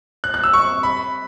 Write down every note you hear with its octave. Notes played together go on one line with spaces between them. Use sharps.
F#6
F#6
E6
C#6
B5